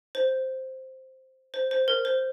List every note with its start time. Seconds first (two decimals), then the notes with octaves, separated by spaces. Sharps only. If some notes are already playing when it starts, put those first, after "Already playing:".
0.15 C5
1.54 C5
1.71 C5
1.88 A#4
2.05 C5